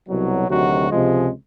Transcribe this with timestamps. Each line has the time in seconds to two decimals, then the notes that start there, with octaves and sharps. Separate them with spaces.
0.09 C2 B2 F#3
0.49 D2 C3 D#3 F#3 F#4
0.90 C#2 C3 F3 G#3